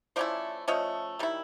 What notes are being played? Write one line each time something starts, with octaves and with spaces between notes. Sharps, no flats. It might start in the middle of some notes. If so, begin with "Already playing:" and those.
F3 A3 C#4 E4 C5 D5
F3 A3 C#4 C#5 D#5
D#3 G3 E4